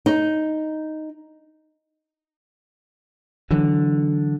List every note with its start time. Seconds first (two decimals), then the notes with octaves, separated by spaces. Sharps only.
0.06 D#4
3.51 D3 E3 F#3